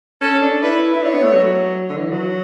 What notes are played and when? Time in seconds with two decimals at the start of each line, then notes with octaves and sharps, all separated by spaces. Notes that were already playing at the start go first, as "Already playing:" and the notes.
0.21 C#4 A4
0.42 D4
0.63 E4 B4
0.94 E4
1.02 D4 C#5
1.14 B3
1.23 A3
1.34 F#3
1.90 D3
1.98 E3
2.11 F#3